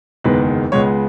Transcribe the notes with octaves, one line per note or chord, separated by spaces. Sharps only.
F#1 E2 D#3 G#3 B3 B4
C#2 C#3 G#3 B3 C#5